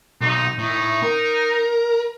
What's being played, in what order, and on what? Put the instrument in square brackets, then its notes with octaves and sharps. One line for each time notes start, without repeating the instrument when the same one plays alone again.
[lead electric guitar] B1 [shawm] D#4
[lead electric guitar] A2 [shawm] D#4
[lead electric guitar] A#4